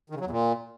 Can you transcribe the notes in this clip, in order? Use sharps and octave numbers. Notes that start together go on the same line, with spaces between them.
D#3
C#3
F#3
E2
A#2